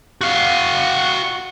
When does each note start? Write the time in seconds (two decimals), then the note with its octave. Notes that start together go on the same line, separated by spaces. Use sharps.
0.21 F#4 F5